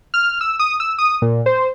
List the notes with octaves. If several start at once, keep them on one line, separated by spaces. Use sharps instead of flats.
F6
E6
D#6
E6
D#6
A#2
C5